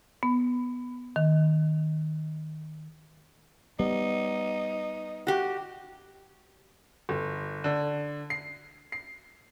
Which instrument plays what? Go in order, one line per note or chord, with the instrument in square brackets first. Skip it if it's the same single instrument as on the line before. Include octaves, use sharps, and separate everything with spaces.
[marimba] B3
D#3
[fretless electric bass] G3 B3 [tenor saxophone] D#4
[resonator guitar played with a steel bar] F#4 G4
[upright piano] G1
D3
C7
C7